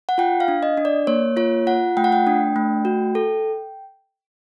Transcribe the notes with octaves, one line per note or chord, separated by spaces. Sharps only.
F#5
F4 G5
F5
D4
D#5
D4
D5
A#3 C#5
F4 C#5
F4 F#5
A3 G5
F#5
G5
D4
A3
F#4
A4